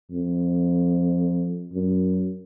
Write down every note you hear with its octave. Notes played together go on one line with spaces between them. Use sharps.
F2
F#2